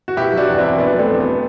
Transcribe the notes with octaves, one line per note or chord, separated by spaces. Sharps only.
F#4
B2 E4 G4
F#3
D4 F#4
E2
E2 C4 E4
B2 B3 D4
F#3
A3 C4
E2
B3